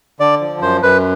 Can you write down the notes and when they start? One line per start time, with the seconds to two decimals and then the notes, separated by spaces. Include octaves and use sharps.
0.20 D3 D5
0.41 F3
0.61 F#2 C5
0.83 F#2 B4